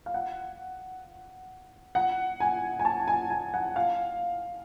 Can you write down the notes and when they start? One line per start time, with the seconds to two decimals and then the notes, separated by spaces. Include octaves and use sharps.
0.06 F5
0.14 F#5
1.95 F#5
2.40 G#5
2.80 G#5
2.85 A5
3.08 G#5
3.30 G#5
3.54 F#5
3.76 F5